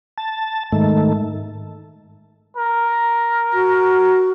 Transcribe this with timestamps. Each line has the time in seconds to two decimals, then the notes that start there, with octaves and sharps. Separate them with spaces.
0.18 A5
0.72 G#2 D#3 A3
2.57 A#4
3.53 F#4